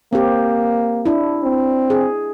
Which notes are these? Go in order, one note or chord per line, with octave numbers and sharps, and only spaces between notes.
A#3 C4 G4
D4 E4
C4
G#4